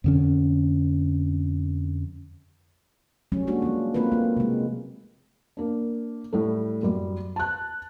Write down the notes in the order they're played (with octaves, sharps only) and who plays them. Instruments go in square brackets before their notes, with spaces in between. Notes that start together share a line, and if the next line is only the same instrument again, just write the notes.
[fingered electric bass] F2 D3 C#4
[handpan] F#3 G3 A3 C#4
G#3 A#3 D4 F#4
F3 G#3 D4 F4
A3 A#3 C4 F4 A#4 B4
A#3 F4
C3 G#3
[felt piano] A#3 D4
A2 G3 A3
F#2 G3
A5 F#6